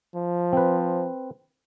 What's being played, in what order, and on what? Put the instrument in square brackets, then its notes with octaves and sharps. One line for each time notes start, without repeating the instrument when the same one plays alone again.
[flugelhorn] F3
[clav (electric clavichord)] C4 B4